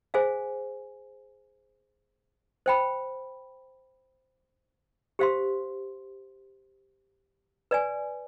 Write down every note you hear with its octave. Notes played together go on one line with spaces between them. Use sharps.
G#4 C5 F5 G#5
C5 G5 B5
G4 C5 F5 C6
B4 D5 G#5